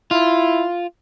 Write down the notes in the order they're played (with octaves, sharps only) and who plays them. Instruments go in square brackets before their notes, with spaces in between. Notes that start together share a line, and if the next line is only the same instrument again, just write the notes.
[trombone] E4 [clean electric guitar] F4